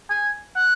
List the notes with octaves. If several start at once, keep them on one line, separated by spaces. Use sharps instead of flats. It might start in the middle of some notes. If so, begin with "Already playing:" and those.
G#5
F#5